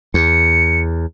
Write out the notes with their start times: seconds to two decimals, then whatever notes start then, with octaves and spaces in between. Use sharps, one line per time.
0.14 E2 C#7